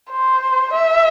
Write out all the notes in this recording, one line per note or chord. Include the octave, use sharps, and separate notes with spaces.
C5
E5